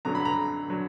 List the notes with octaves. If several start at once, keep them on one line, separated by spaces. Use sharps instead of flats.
F#2 D3 F#3 A#5
B5
A#5
D3 F#3